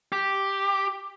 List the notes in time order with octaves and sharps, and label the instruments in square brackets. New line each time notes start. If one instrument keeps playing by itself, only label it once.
[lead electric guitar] G4